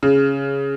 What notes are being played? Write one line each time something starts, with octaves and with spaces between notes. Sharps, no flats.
C#3